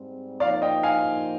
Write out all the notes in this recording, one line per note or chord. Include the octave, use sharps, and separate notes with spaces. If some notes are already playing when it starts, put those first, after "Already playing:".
Already playing: G#2 G3 C4
F3 A#3 D#4 D5 F5
D#5 G5
F5 G#5